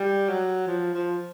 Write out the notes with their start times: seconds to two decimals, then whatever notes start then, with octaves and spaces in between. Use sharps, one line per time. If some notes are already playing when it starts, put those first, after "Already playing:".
Already playing: G3
0.29 F#3
0.67 F3
0.94 F3